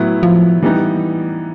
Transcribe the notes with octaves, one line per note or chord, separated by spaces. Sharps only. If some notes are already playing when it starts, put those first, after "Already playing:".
Already playing: A2 F#3 B3 E4
F3
E3 G3 B3 D#4